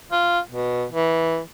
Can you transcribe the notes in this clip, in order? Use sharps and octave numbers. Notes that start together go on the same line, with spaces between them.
F4
B2
E3